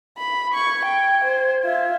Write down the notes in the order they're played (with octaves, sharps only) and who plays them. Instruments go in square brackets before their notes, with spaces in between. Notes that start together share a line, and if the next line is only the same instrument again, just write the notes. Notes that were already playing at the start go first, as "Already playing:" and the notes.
[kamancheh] B5
[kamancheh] C#6 [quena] G#6
[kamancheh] G5
C5
F4 E5